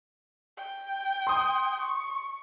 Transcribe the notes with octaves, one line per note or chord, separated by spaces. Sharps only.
G5
C6 D#6
C#6